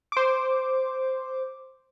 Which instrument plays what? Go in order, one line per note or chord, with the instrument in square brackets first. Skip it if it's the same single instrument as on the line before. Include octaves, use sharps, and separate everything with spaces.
[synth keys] C5 D6